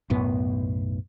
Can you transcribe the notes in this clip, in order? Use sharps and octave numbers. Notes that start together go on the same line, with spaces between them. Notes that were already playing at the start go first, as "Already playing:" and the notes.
B1 F#2 A2 B3